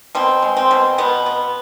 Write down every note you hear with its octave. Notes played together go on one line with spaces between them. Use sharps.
B2 C4
G#3
C4
B2
B2 B3
B3